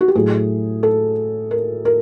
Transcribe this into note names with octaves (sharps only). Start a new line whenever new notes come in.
F#4
G4
A2 F#3 G#4
A4
A#4
A#4